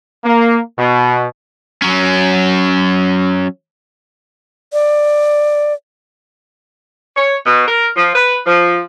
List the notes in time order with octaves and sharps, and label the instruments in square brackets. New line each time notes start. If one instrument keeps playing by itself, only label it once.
[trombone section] A#3
B2
[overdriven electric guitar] F#3 C#4
[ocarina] D5
[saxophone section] C#5
B2
A#4
F3
B4
F3